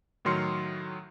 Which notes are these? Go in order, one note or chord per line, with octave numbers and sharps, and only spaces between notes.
A2 D#3 F#3 C6 F6 C#7